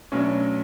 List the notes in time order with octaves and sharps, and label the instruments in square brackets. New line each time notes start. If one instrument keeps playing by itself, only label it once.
[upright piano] B1 A2 F#3 B3 D4 [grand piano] C#4